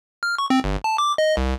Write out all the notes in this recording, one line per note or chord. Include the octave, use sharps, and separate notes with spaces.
F6
C#6
C4
G1
A5
D6
D#5
C2